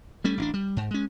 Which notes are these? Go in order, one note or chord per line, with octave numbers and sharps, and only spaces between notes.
G3 A3 C#4
A1 C4 D4
G3
G#2
G#3 C#4